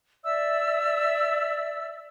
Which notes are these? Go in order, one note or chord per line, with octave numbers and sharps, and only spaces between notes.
D5 E5 E6